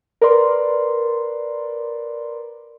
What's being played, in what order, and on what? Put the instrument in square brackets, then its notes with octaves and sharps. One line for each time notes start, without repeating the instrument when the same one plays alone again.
[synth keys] A#4 B4 D5 C6